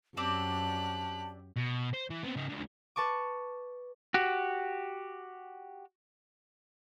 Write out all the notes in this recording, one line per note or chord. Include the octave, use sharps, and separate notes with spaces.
F#2 C4 D4 G4 D5 A5 F#6
B2
C5
E3
B3 C4
C#3 D#4
C#2 D3
B4 A5 C#6 D6
F#4 G4